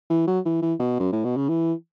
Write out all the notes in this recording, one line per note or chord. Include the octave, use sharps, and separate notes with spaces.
E3
F#3
E3
E3
B2
F#2
A2
B2
C#3
E3